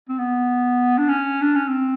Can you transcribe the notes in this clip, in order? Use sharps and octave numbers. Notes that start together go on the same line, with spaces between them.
C4
B3
D4
C#4
D4
C#4
C4